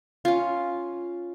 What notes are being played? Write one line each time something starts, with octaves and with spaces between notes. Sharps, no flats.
C#4 F4